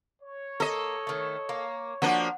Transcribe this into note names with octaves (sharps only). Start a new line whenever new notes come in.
C#5
A#3 A4 D#5
D#3 A3
A#3
F3 A#3 D4 F#4